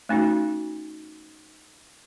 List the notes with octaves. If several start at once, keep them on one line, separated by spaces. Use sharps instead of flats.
A3 C#4 D#4 F#4